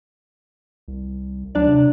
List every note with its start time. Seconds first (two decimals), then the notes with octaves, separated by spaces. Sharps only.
0.88 C2
1.55 D2 F#3 D4 D5
1.67 C3